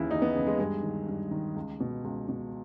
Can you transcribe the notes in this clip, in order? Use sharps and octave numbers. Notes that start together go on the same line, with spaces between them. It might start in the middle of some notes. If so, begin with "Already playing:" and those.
Already playing: D#2 C#3 E3 E4
D#2 D#4
B3
C#3 E3
G#3
G2 G#3
D#3
G2
D#3
C#2
B2
C#2
B2